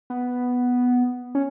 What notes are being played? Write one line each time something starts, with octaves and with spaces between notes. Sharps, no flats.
B3
C#4